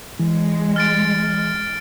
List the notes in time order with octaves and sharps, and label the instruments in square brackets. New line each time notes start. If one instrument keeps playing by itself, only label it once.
[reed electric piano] E3 [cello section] G#3
[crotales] F6 A6 D7